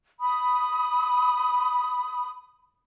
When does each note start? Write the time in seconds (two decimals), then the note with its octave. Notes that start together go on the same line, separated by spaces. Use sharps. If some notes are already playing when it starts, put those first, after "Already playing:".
0.20 B5 D#6